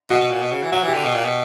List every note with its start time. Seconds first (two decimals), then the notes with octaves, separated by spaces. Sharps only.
0.10 B2 F#4
0.20 B2
0.31 A#2
0.41 B2
0.52 C#3
0.63 E3
0.72 F#3 F#4
0.83 E3
0.88 G4
0.94 D3
1.04 B2
1.14 A#2
1.25 B2